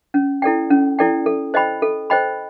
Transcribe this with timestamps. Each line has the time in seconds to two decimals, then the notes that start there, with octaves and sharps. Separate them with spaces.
0.14 C#4
0.42 E4 A4 D5 G5
0.70 C#4
0.99 E4 A4 D5 G5
1.26 A4
1.54 C5 D#5 G5 B5
1.82 A4
2.10 C5 D#5 G5 B5